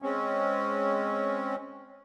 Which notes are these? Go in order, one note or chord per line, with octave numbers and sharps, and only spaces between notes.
G#3 C4 C#4